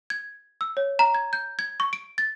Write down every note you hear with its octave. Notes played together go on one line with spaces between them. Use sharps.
G#6
E6
C#5
A#5
G#6
G6
G#6
C#6
D7
A6